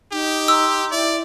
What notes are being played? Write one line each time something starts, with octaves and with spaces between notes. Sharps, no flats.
D#4 G4
A#5 C6 E6
E4 D5 E5